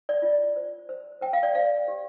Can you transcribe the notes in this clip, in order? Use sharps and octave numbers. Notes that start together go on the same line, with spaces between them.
D5
F4
C5
C5
C5 G5
F5
D5
C5 F5
G4